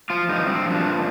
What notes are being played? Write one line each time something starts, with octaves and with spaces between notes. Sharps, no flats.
F3 F4
G2 D#4
G2 C4
F3
D4
G2